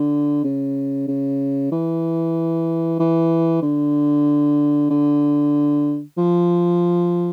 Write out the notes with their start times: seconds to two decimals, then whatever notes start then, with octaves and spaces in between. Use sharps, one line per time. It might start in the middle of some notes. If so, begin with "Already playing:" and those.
Already playing: D3
0.44 C#3
1.08 C#3
1.72 E3
2.99 E3
3.62 D3
4.90 D3
6.18 F3